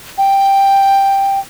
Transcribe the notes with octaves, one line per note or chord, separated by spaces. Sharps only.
G5